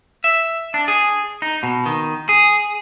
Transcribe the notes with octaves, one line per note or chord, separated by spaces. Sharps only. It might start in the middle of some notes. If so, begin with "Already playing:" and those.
E5
D4
G#4
D#4
B2
D#3
G#4